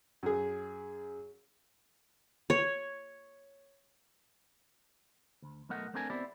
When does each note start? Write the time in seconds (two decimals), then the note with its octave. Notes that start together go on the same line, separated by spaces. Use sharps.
0.23 F#2 G#4
2.50 C#5
5.42 D2
5.69 B1 B2 A3 A#4 D#5 F#5
5.94 A3 C4 D4 A4 A#4 G#5
6.10 B3 C4 E4 G4 D5